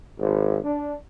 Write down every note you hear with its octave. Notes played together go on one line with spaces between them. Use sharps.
G#1
D4